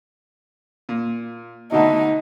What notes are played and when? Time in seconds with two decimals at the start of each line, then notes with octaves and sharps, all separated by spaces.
0.89 A#2
1.72 B2 D3 A3 D#4